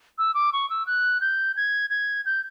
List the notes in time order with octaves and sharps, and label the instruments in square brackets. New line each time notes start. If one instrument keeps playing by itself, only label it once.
[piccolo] E6
D6
C#6
E6
F#6
G6
G#6
G#6
G6